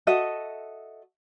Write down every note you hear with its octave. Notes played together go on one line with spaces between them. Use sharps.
F#4 A4 D#5 E5